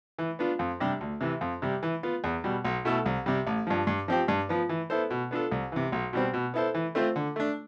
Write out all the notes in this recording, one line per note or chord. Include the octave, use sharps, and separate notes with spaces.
E3
B3 D4 F4
F2
C3 G3 D4 G4
D2
C3 E3
F2
C3 G3
E3
B3 F4
E2
B2 G3
B1
B2 A3 E4 A4
C2
C3 G3
A1
G2 F3
G2
F3 C4 G4
G2
F3 B3
E3
B3 E4 A4 C5
B2
B3 D4 F4 A4
C2
C3 E3
B1
B2 G3 C4
B2
B3 E4 A4 C5
E3
A3 C4 F4 C5
D3
A3 D4